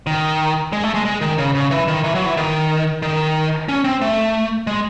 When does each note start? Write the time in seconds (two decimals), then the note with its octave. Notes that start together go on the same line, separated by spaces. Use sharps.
0.07 D#3
0.73 G#3
0.83 A3
0.94 G#3
1.05 G#3
1.21 D#3
1.38 C#3
1.55 C#3
1.71 E3
1.88 D#3
2.04 E3
2.15 F#3
2.26 E3
2.37 D#3
3.02 D#3
3.69 C#4
3.84 C4
4.01 A3
4.67 G#3